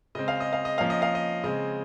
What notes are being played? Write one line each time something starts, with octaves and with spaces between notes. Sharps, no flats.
C#3 G#3 C4 D#5
F5
D#5
F5
D#5
F3 A#3 C#4 F5
D#5
F5
D#5
C#3 G#3 C4 D#5